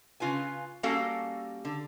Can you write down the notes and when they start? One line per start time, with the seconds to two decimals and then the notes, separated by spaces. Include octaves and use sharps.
0.20 C#3 F4 B4 G#5
0.83 G3 A#3 C#4 F#4 A4 F5
1.65 D3